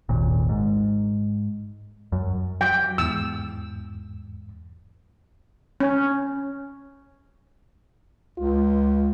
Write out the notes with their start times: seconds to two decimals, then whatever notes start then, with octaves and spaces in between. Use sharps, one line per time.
0.09 G#1 D#2 A#2
0.49 G#2
2.12 F#2
2.61 F#3 G5
2.98 E2 G#2 E6
5.80 C#4
8.38 C#2 F4